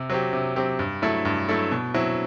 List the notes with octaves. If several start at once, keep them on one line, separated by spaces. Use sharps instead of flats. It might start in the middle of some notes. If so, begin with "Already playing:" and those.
Already playing: C3
F#3 C4 G4
C3
F#3 C4 G4
G2
F#3 A3 E4 A4
G2
F#3 A3 E4 A4
B2
F#3 C4 E4